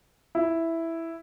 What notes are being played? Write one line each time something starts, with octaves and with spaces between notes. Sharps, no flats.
E4